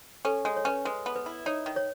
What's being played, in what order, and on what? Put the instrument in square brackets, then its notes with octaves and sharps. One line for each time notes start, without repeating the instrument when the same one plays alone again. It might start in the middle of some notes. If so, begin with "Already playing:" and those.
[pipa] C#4 [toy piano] A4
[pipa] G#3 [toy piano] C#5
[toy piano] C#5
[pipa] C#4 [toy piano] B4
[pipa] G#3 [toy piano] B4
[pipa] B3
[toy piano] B4
[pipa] E4
[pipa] D#4 [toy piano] C#5
[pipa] D#3
[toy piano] C#5